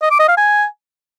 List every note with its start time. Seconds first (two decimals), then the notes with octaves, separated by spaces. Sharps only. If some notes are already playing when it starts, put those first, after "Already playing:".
0.02 D#5
0.11 D6
0.20 D#5
0.29 F5
0.37 G#5